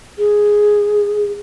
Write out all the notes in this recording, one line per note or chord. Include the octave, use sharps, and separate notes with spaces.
G#4